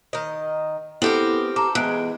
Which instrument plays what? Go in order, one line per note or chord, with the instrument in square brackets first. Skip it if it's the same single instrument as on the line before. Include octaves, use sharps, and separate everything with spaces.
[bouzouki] D#3 D#5
[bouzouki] B3 [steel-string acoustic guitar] C4 G4 A#4 [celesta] E4 A4
[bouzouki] A4 [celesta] A#5 D6
[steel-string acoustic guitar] E2 [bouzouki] G#3 [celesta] F#6 D7